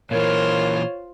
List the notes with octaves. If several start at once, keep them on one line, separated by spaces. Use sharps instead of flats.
A#2 D#3 E3 F4 A#4 C5 C#5